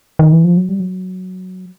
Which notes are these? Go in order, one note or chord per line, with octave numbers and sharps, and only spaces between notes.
D#3
E3
F3
F#3
G3
F#3